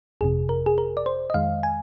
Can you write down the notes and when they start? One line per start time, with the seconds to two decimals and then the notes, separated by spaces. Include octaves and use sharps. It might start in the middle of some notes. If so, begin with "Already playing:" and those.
0.21 G1 F2 C3 G#4
0.49 A#4
0.66 G#4
0.78 A#4
0.97 D5
1.06 C5
1.30 D#5
1.34 F2 D#3 G#3 F5
1.63 G#5